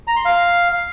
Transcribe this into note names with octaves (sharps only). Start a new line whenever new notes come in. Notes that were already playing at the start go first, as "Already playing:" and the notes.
A#5
C6
F5